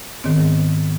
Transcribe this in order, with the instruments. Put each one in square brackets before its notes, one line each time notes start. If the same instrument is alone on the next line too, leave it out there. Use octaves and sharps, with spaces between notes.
[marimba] G#2 D#3 B3 C4